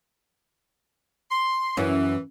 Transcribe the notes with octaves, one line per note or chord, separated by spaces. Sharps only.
C6
F#2 E3 C#4